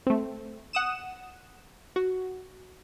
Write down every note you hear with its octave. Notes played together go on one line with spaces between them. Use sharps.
A3 C4
F#5 D#6 E7
F#4